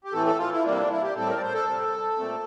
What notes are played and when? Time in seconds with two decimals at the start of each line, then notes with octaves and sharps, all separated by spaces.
0.04 G4
0.13 A2 E3 A3 C4 A4
0.27 A4
0.39 F4
0.52 E4
0.65 C3 G3 A#3 D4
0.73 E4
0.77 D4
0.91 E4
1.02 G4
1.16 A2 G3 C4 A4
1.28 A#4
1.37 D5
1.42 C5
1.54 A4
1.67 C3 G3 C4
2.18 A#2 A3 C4